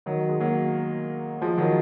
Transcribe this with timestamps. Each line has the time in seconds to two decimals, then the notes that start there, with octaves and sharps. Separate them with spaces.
0.06 D#3 F#3
0.29 G#3
0.40 F#3 A#3
1.41 F3 G#3
1.58 D#3 F#3